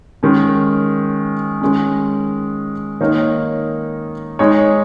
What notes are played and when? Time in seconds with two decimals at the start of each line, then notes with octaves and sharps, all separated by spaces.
0.23 D#3 G#3 C#4
1.61 D#3 G#3 C#4
3.01 D#3 A#3 D#4 A#4 C#5
4.39 G#3 D#4 C#5